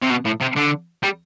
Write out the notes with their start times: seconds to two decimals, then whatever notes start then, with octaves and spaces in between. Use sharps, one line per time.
0.03 C3
0.10 B2
0.26 A2
0.41 C3
0.57 D3
1.03 G3